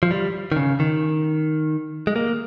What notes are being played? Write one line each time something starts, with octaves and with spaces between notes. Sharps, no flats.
F3
G3
D#3
C#3
D#3
G#3
A#3